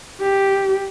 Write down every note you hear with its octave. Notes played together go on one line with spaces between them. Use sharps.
G4